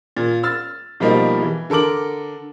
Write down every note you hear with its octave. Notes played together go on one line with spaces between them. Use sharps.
A#2
E6 F6 A6
B2 F3 G3 A#3 D#4
E3
D3 A4 A#4 D6 F#7